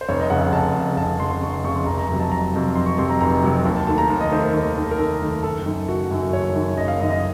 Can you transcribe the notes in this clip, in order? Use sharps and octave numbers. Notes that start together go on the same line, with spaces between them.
C5
F1 C#5
D#5
F2 C#3 F#5
F#5
F1 A5
F2 C#3
F1 A5
F2 C#3 C6
C6
F1 C#6
C6
F2 C#3 C#6
C6
F1 A#5
A#5
F2 C3 F#3 A#5
A5
F1 A#5
F2 C3 F#3
F1 C6
C#6
F2 C3 F#3 C6
A#5
F1 A#5
F2 C3 F#3
D#2 A5
A5
D#3 A3 A5
A#5
D#2
D#5
D#3 A3 C5
A#4
D#2
D#3 A3
A#4
D#2 A4
D#3 A3
F#1 A4
F#2 D#3
F#1 F#4
F#2 D#3
F#1 C#5
F#2 D#3
F#1 D#5
F5
F#2 D#3 D#5
D#5